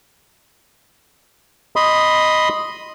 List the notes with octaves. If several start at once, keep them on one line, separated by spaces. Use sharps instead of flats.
D#5 B5 C6 D#6